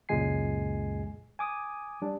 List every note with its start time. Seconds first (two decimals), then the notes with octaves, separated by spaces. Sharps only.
0.09 C#2 F#2 A#2 G#3 G#5 C7
1.39 G#5 D6 D#6
2.02 G3 D4